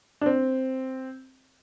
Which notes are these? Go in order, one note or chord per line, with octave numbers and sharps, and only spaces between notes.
D4
C4